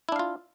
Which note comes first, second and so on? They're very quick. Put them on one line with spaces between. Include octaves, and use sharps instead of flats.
E4 D4 F5 F4